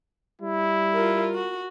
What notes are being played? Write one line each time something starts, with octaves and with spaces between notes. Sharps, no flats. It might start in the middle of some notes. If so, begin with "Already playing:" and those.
G3 E4
F4 A#4
F#4